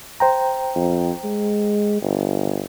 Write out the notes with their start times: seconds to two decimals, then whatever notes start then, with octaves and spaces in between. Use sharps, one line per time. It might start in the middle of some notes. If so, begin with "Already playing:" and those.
0.20 C5 G5 A#5
0.75 F2
1.24 G#3
2.02 G1